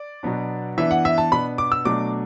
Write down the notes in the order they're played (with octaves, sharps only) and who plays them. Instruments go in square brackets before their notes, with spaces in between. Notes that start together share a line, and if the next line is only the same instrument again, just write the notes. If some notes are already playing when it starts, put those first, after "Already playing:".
Already playing: [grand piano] D5
B2 F#3 B3 D4
E3 B3 D4 E5
F#5
E5
A5
B2 B3 D4 B5
D6
E6
B2 F#3 A3 D4 D6